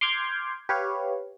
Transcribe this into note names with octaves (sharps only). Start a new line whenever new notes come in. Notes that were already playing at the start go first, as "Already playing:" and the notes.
C6 D6 F6 G6 G#6
G4 B4 C#5 F5